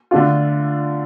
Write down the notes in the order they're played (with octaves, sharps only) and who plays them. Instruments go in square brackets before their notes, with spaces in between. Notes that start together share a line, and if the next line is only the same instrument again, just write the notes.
[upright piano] D3 A3 D4 F4